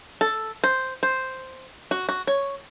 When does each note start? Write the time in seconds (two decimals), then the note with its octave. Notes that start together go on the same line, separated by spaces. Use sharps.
0.21 A4
0.64 C5
1.03 C5
1.91 F#4
2.09 F#4
2.27 C#5